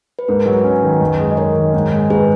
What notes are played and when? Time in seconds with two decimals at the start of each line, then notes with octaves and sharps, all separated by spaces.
0.19 B4
0.28 G#2 A#4
0.46 F#3 G#4 B4
0.64 C#4
0.83 D#3
1.01 F#2
1.19 G#3
1.31 D#5
1.37 D#4 A#4 C#5
1.56 D#3
1.74 G#2
1.92 G#3
2.10 G#2 G#4 B4